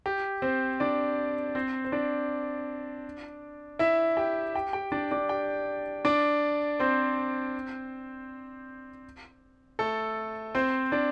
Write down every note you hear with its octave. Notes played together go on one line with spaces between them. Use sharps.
G4
C4 C5
D4 D5
C4 C5
C5
D4 D5
E4 E5
G4 G5
G4 G5
G4 G5
D4 D5
D4 D5
G4 G5
D4 D5
C4 C5
A3 A4
C4 C5
D4 D5